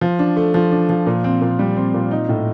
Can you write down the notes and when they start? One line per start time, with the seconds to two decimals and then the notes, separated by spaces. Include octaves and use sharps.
0.01 F3
0.19 D4
0.36 A3
0.54 F3
0.71 D4
0.89 F3
1.06 A#2
1.24 C4
1.41 A#2
1.59 G3
1.76 C4
1.94 A#2
2.11 D#4
2.29 A2